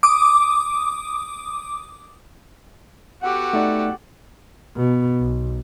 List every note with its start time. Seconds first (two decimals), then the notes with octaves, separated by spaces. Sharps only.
0.03 D6 D#6
3.22 B3 F#4 G4 A4 F#5
3.53 A3 D#4 D5
4.76 B2
5.20 B1